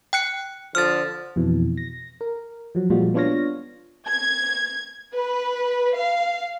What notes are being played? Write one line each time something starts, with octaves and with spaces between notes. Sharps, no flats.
G5 F#6 C#7
D3 F3 F6 A6
F2 B2 E3
A#6
A#4
F3 F#3
A#2 F3 G3 G#3 F4 F#4
B3 D4 F4 C#5 F5 A#6
G#6
B4
F5